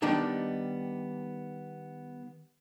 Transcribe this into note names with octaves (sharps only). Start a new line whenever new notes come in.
D#3 G3 B3 D4 D#4